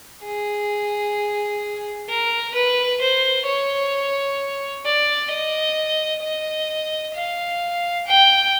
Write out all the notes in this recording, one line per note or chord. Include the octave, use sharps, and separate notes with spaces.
G#4
A#4
B4
C5
C#5
D5
D#5
D#5
F5
G5